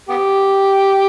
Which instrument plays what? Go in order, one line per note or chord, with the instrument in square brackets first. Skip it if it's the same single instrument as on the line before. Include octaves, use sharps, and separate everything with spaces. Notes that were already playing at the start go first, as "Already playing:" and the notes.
[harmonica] B3 G4